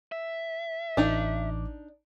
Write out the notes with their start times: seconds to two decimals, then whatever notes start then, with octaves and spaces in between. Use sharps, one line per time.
0.12 E5
0.97 A1 D4 D#4 D6